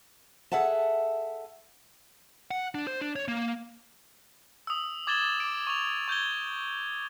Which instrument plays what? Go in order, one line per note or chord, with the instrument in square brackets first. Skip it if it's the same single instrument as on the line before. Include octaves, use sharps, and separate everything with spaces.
[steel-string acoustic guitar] G#4 A4 E5 F#5 A5
[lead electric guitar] F#5
D4
C5
D4
C#5
A#3
[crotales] D#6 E6
D6 G#6 A6 E7 F#7 G7
D6 D7
C#6 D6 F7
C#6 G6 G#6 G7